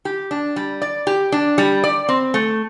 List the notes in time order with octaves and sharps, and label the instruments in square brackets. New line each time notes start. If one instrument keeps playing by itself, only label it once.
[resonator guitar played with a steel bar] G4
D4
G3
D5
G4
D4
G3
D5
C4
A3